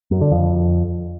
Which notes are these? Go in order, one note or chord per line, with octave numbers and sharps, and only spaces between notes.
F#2
D3
F2